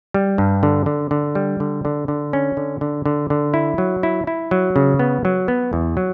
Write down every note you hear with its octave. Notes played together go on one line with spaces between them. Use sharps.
G3
G2
D3
D3
D3
G3
D3
D3
D3
C#4
D3
D3
D3
D3
E4
F#3
E4
E4
F#3
C#3
B3
F#3
B3
E2
F#3